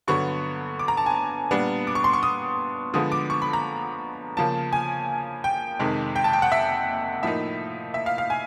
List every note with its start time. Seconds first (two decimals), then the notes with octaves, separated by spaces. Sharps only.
0.07 G2 D3 F#3 B3 C#6
0.79 D6
0.88 A#5
0.97 A5
1.06 G#5
1.51 A#2 G3 B3 D4
1.87 D6
1.95 C#6
2.04 C6
2.13 C#6
2.23 D#6
2.94 D3 F3 G#3 B3 D#6
3.12 D6
3.30 C#6
3.42 B5
3.53 A#5
4.37 C#3 F3 A#3 A5
4.73 G#5
5.44 G5
5.79 F2 C3 D#3 G#3
6.16 G5
6.24 A5
6.33 G5
6.42 F#5
6.52 E5
7.23 A2 F3 A#3 D#4 E5
7.94 E5
8.06 F5
8.18 F5
8.30 G#5